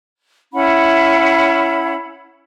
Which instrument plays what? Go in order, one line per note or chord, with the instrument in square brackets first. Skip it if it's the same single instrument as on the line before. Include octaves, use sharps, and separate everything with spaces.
[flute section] C#4 E4 F#5 B5